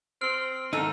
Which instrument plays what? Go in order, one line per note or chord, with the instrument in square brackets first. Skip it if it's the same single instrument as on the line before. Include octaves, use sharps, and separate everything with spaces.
[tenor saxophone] C4 [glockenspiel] C6 F6
[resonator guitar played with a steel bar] G#2 D#3 A4 [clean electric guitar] D#4 [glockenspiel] E6